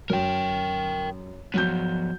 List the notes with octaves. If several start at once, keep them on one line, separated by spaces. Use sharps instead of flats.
F#2 A#4 G5
F3 F#3 B3 G6